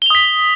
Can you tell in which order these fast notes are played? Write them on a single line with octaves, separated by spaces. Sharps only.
G7 F7 D#6 B6